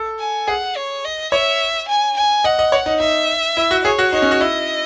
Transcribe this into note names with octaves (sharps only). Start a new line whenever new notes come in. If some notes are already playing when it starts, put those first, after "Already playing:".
Already playing: A4
G#5
G#4 F#5
C#5
D#5
C#5 E5
G#5
G#5
D#5 F#5
D#5
C#5
D#4
D#4 E5
E4
F#4
G#4 C#5
F#4
D#4 C#5
C#4
F#4
E4 D#5